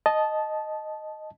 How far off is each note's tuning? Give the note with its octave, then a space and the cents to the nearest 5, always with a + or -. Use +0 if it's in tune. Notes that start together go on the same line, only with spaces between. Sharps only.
D#5 -5 A5 -15